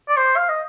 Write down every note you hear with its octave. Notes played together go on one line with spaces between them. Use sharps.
D5
C5
F5
D#5